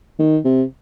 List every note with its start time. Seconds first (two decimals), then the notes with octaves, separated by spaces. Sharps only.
0.19 D#3
0.45 C3